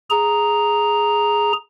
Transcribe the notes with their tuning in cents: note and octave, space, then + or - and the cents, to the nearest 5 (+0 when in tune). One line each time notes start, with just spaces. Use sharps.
G#4 +0 A#5 +0